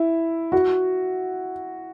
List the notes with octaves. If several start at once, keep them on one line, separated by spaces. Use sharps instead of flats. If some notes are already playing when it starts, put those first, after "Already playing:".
Already playing: E4
F#4